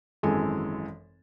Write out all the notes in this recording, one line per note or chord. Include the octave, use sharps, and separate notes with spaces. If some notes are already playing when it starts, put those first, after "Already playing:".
G#1 F#2 E3 G#3 A4 G#5